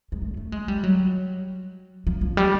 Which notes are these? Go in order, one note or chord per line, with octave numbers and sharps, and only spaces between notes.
G#3
A3
A3
G#3
G3
F#3
F3
F3
G3